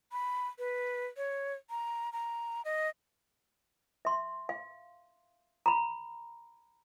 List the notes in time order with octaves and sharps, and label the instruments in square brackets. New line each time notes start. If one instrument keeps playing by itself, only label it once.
[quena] B5
B4
C#5
A#5
A#5
D#5
[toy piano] E5 C6
F5
A#5 B5